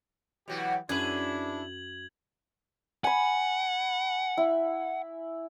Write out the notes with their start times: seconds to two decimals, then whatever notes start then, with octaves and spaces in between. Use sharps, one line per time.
0.48 B2 E3 F#3 F#4 G4
0.89 F#2 D4 E4 G#4 B4 G#6 F#7
3.04 F#5 G#5 B5
4.38 E4